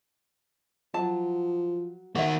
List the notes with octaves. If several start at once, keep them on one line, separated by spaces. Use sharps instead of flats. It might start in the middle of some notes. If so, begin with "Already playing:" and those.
F3 F#3 A5
D#3 A#3 F#4 E5